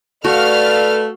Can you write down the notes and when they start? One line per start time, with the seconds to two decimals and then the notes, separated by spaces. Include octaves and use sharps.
0.24 A3 F#4 A4 B4 D5 F5 F6